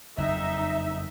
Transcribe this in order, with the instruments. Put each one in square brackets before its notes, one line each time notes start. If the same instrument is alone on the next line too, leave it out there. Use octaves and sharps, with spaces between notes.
[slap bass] F#1 F2 [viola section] D#4 E5